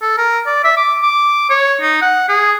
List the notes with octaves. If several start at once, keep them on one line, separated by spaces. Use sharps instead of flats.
A4
A#4
D5
E5
D6
D6
C#5
D#4
F#5
G#4